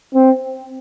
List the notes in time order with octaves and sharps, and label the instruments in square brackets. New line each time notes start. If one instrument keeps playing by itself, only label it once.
[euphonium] C4